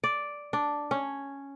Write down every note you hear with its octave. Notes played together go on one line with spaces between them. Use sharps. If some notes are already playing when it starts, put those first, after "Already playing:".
D5
D4
C#4